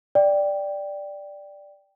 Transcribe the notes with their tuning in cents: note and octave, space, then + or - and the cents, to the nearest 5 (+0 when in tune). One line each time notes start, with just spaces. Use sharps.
D5 +0 G5 +0